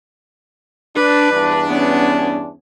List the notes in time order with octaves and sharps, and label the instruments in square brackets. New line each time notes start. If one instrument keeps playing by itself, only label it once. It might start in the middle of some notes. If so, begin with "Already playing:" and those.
[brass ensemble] D4 [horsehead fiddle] B4
[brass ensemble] E2 G2 D4
[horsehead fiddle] B3 C#4